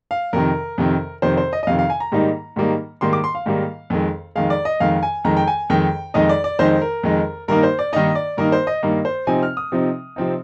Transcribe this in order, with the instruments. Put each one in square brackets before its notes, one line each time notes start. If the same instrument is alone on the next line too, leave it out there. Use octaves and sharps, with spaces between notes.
[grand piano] F5
F2 C3 D#3 A#4
F2 C3 D#3
F2 C3 D#3 C5
C5
D#5
D#5
F2 C3 D#3 F5
F5
G#5
A#5
G#2 D#3 G3 A#3 D#4
G#2 D#3 G3 A#3 D#4
G#2 D#3 G3 A#3 D#4 C6
D6
C6
F5
G#2 D#3 G3 A#3 D#4
F2 D#3 G#3
F2 D#3 G#3 F5
D5
D#5
F2 D#3 G#3 F5
G#5
F2 D#3 G#3 A#5
G5
G#5
F2 D#3 G#3 D#4 G5
F2 D#3 G#3 D#4 D#5
D5
D5
F2 D#3 G#3 D#4 C5
A#4
F2 D#3 G#3 D#4
G2 D#3 A#3 D#4 A#4
C5
D5
G2 D#3 A#3 D#4 D#5
D5
G2 D#3 A#3 D#4 A#4
C5
D#5
G2 D#3 A#3 D#4
C5
C3 F3 C4 D#4 G#5
F6
D#6
C3 F3 C4 D#4
C3 F3 C4 D#4